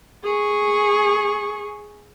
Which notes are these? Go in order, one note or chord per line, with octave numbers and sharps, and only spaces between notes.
G#4 C#6